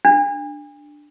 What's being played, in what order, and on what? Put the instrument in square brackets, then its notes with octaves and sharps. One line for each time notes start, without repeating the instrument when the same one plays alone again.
[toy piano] D4